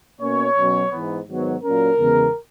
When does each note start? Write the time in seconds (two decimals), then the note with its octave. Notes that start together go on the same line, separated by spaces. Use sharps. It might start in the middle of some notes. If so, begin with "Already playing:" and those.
0.20 B2 A#3 C#4 C#5
0.57 B2 F#3 C#4
0.91 G#2 E3 B3
1.27 G#2 D#3 F#3 B3
1.62 A#2 F#3 C#4 A#4
1.98 E2 C#3 G#3 B3